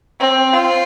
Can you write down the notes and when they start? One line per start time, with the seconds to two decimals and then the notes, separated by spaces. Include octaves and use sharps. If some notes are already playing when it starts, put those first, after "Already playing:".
0.20 C4
0.54 F4